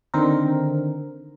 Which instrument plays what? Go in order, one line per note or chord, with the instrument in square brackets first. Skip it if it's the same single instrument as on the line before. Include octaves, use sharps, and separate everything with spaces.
[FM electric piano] D3 D#3 C4 A#4